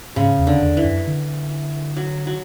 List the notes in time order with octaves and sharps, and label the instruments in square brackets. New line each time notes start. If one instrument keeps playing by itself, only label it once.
[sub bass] G#2 [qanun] C#3
[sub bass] E2
[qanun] D3
[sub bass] E2
[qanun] E3
[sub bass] F#2
D3
[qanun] F#3
F#3